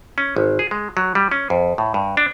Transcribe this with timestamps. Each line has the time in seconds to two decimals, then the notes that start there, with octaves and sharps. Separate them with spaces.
0.18 C#4
0.36 G#1
0.59 G#4
0.71 G#3
0.97 F#3
1.15 G3
1.31 C#4
1.50 F2
1.78 A2
1.94 G2
2.17 D4